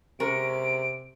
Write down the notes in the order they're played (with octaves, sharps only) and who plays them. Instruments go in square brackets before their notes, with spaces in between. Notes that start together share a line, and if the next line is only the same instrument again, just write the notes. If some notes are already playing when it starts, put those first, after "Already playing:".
[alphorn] C3 [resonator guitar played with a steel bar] G#3 C#4 A#4 [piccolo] D7